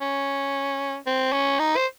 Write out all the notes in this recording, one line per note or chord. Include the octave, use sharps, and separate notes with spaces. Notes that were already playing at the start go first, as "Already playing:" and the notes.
C#4
C4
C#4
D#4
C5